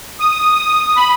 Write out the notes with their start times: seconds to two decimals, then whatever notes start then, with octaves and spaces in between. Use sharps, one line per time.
0.20 D#6
0.96 B5